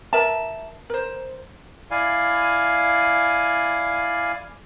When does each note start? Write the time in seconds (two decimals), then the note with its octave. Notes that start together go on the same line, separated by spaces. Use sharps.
0.13 A#4 E5 A5
0.90 A#4 C5
1.91 E4 D5 F5 G#5